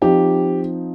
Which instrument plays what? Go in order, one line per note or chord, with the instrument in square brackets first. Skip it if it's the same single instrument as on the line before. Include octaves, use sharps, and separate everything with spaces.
[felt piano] F3 C4 D#4 [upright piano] G4